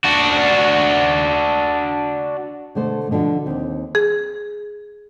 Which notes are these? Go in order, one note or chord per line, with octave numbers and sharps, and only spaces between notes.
D4 F#4
B2 D3 A3 C5
B2 D3 F3 D4 F#4
D#2 C4
G#4